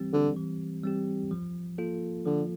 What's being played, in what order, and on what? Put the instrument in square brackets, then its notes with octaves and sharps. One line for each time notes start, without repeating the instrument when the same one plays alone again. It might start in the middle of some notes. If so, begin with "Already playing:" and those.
Already playing: [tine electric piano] E3 G3 C4 G4
[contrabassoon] D3
[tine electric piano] E3
G3 C4 G4
F3
A#3 F4 A4
[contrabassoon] D3 [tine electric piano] F3